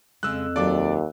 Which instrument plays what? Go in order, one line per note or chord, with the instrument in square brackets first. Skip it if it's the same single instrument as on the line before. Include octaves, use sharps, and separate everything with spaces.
[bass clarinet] F2 [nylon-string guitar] C#3 G#3 [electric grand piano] E6 F#6
[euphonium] D#2 [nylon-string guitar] F#3 F4 A4 [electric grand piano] D5 D6